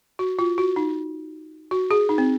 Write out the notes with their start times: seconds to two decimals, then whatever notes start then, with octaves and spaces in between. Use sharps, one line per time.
0.19 F#4
0.39 F4
0.58 F#4
0.76 D#4
1.71 F#4
1.91 G#4
2.09 D#4
2.18 C4